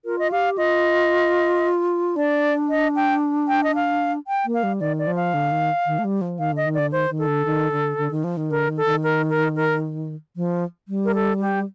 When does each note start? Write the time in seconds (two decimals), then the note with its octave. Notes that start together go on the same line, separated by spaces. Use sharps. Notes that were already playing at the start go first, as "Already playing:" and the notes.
0.05 F4 A#4
0.19 D#5
0.31 G4 F5
0.58 F4 D#5
2.16 D4 D5
2.70 D#5
2.96 G5
3.48 G5
3.64 D#5
3.75 F5
4.27 G5
4.45 A#3
4.54 F5
4.63 G3
4.80 D#3 D5
4.99 D5
5.07 F3
5.16 F5
5.34 D3
5.51 D#3
5.86 D#3
5.99 A3
6.04 G3
6.21 F3
6.39 D#3 F5
6.52 D3 D#5
6.66 D#3
6.74 D3 D5
6.92 D#3 C5
7.10 D#3
7.19 A4
7.27 D3
7.45 D#3
7.72 D3
7.97 D3
8.11 D#3
8.24 F3
8.37 D#3
8.50 D3 A#4
8.68 D#3
8.77 A4
8.85 D#3
9.04 A#4
9.30 A#4
9.56 A#4
10.36 F3
10.88 G3
11.05 A#4
11.15 A4
11.41 G4